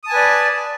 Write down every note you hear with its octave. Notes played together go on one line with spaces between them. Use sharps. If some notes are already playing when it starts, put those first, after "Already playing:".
B4 D5 G#5 A5 D#6